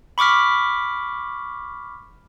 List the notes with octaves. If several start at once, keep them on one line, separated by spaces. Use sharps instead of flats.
B5 C#6 D6 F6 B6